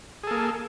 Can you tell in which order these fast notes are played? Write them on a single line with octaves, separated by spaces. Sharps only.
G#4 A4 A#3